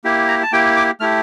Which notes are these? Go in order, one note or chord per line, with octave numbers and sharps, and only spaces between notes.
A#3 E4 G4
A#5
A5
A#3 E4 G4 G5
D6
A3 E4 G4 F6